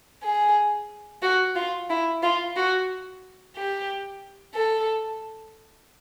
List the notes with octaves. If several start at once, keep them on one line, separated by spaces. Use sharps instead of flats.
G#4
F#4
F4
E4
F4
F#4
G4
A4